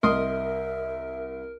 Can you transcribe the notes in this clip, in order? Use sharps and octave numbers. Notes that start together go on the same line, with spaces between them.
C2 A#4 D#5 E5 C6 D#6